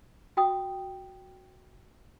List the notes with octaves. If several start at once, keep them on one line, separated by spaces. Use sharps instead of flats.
F#4 G5 D#6